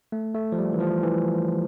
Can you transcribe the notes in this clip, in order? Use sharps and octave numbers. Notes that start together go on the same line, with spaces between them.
A3
A3
F3
G3
E3
F3
E3